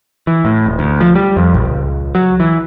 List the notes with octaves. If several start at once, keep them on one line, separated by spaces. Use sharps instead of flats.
E3
A2
D#1
D2
F3
G3
F2
A#1
C#2
F#3
E3